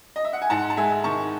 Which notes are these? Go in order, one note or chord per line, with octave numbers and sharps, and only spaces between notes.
D#5
E5
F#5
G#5
G#2 F#5 A5
A5
G#3 E5 G#5
D#3 A5 C#6